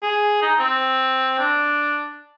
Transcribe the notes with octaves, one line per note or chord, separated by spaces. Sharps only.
G#4
D#4
C4
D4